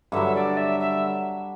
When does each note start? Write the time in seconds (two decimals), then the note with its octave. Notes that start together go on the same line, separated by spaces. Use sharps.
0.12 G2 D3 F#3 E5
0.35 D5
0.57 E5
0.80 E5